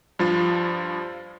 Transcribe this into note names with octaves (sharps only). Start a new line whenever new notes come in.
G2 F3 F4 A6